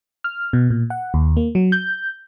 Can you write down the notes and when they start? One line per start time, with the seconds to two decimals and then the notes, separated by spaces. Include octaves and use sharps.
0.24 F6
0.53 B2
0.70 A#2
0.90 F#5
1.14 D#2
1.37 A#3
1.55 F#3
1.72 G6